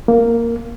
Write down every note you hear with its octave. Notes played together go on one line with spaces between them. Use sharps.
A#3